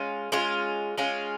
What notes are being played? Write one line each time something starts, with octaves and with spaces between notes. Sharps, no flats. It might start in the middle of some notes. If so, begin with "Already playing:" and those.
Already playing: G#3 C#4 F4
G#3 C#4 F4
G#3 C#4 F4